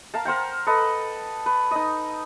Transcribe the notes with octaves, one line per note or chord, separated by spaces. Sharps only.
A#4 F5 A5
A#4 C5 F#5 G5
A4 B4 D#5
B4
D#4 D#5